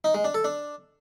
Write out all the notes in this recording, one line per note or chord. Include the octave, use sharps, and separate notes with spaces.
D#4
G#3
D4
A4
D4